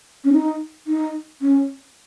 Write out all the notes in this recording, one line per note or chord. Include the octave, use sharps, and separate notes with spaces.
C#4
D#4
D#4
C#4